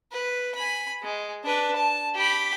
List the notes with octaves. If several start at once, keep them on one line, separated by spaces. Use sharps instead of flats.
B4
G#5 B5
G#3
D4 B4
A5
G4 B5